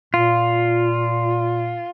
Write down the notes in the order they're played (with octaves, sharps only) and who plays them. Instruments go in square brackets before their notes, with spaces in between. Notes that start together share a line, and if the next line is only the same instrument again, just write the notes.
[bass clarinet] A#2 [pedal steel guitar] F4